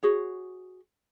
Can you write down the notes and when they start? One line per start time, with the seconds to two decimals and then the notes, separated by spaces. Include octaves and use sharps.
0.03 F#4 G#4 C#5